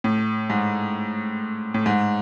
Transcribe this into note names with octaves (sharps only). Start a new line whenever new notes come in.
A2
G#2
A2
G#2